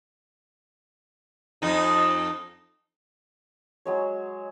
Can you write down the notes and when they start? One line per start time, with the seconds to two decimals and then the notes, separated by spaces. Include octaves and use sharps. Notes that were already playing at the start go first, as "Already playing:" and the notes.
1.62 F2 D#4
3.85 F#3 G#3 C#5